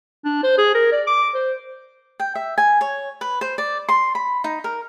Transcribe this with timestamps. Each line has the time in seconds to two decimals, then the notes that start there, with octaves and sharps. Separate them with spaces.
0.25 D4
0.43 C5
0.58 G#4
0.74 A#4
0.92 D5
1.07 D6
1.35 C5
2.20 G5
2.35 E5
2.58 G#5
2.81 C#5
3.21 B4
3.41 C5
3.58 D5
3.89 C6
4.15 B5
4.44 D#4
4.64 A#4